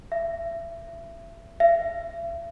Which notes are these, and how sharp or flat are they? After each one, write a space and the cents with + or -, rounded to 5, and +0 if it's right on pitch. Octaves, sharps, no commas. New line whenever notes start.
E5 +30
E5 +45